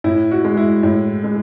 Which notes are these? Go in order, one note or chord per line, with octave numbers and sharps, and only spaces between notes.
A2 E4
F#4
G#3
E4
A2
G#3